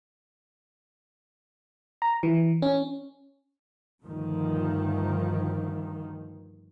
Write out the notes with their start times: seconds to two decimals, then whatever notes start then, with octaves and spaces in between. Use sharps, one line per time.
2.02 A#5
2.23 E3
2.62 C#4
4.02 D2 G2 D#3 F3